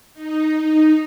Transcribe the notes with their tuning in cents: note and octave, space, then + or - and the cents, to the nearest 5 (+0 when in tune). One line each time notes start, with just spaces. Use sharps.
D#4 -5